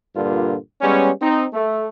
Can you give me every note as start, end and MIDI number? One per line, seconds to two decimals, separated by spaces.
0.16 0.56 43
0.16 0.56 46
0.16 0.56 50
0.16 0.56 58
0.16 0.56 65
0.82 1.10 55
0.82 1.10 56
0.82 1.10 59
0.82 1.10 61
1.22 1.45 60
1.22 1.45 63
1.53 1.87 57